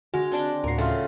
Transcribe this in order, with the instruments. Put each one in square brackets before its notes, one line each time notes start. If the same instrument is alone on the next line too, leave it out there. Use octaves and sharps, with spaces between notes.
[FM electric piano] D3 F#4 [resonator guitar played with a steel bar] G#3
[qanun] C4 D4 G5
[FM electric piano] D2 A2 C7 [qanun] F#4 A#4
[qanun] C#3 [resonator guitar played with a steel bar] A3 F4